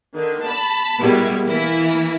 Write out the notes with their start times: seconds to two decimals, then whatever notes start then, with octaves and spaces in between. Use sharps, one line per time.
0.12 D3 D#3
0.45 A5 B5
1.01 B2 G3 G#3 E4 A#4
1.45 E3 A#3 E4